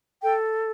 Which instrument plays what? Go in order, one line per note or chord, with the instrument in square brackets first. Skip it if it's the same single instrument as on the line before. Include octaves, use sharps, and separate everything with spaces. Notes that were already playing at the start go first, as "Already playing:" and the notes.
[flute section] A4 G5